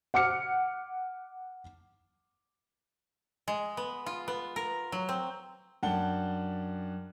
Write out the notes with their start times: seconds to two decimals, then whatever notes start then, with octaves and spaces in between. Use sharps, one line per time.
0.14 F#5 D6 F6 C#7
3.48 G#3
3.77 B3
4.06 F4
4.28 B3
4.56 A#4
4.92 F#3
5.09 C4
5.83 F#2 D4 F#5 G5 A5 G7